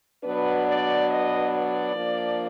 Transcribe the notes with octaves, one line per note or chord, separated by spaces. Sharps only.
B2 F#3 B3 D4 B4
D5
D#5
D5
F3 A#3 D4